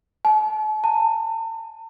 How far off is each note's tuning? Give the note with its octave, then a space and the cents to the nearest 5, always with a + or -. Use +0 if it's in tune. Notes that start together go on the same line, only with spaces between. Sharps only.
A5 -40
A5 +45